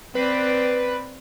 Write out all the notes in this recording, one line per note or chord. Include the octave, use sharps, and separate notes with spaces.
C4 B4 D5